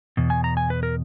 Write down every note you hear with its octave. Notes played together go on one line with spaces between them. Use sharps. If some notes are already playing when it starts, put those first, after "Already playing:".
E2 B2
G#5
A#5
G#5
B4
A#4